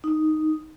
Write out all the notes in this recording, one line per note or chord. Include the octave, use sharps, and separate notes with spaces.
D#4